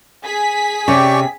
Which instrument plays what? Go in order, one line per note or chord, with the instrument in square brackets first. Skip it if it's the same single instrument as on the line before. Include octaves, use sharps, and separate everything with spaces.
[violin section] G#4 B6
[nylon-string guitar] C3 C#4 [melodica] G4 D5 C#6